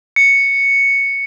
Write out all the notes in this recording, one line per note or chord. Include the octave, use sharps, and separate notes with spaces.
C#7